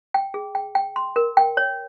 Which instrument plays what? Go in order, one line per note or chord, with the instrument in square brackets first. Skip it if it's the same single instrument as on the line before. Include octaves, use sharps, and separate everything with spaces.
[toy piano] G5
G#4
G5
G5
C6
A#4
G5
C#5